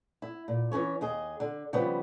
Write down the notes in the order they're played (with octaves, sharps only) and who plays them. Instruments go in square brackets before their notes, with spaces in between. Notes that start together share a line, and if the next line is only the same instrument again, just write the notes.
[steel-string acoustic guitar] E4
A#2
E3 F3 C#4 C#5
D#2 G#4 D#5
D3
C#3 F3 G3 B3